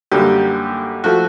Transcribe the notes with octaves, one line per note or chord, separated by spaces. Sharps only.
F#2 D3 G3 A#3 G4
F3 A3 F#4